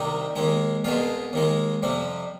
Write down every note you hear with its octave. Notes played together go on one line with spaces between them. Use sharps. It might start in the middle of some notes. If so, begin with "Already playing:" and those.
Already playing: C2 C3 D#3 G3 D#4
D#2 D#3 G#3
C2 B2 G#3 F4
D#2 D#3 G#3
F2 C3 G3